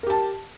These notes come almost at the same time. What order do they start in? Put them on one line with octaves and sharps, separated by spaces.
A#4 G4 A5